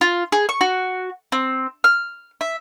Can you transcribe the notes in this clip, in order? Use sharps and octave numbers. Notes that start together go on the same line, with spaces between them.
F4
G#4
C#6
F#4
C4
F6
E5